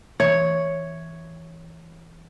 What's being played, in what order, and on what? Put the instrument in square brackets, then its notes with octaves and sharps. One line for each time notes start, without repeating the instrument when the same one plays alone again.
[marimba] E3 [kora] C#5